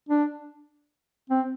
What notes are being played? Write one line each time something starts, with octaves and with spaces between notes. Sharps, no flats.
D4
C4